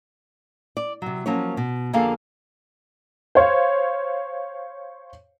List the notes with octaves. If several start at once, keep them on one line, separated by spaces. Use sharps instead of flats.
D5
C3 F#3
F3 F#3 A#3 C#4 C#5
B2
F2 D3 A#3 G#4 A4 F5
C5 C#5 F5